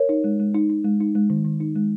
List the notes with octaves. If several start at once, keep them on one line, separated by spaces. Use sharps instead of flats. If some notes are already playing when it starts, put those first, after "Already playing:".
Already playing: A#4 C#5
D#4
G#3
G#3
D#4
D#4
G#3
D#4
G#3
D#3
D#3
D#4
G#3